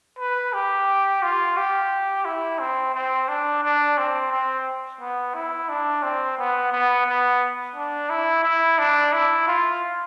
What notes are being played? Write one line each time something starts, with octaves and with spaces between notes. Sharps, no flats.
B4
G4
F4
G4
E4
C4
C4
D4
D4
C4
C4
B3
E4
D4
C4
B3
B3
B3
D4
E4
E4
D4
E4
F4